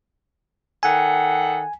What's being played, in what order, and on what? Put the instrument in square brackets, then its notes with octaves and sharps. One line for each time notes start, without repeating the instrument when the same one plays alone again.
[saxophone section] D#3 A4 F#5 [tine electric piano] G#5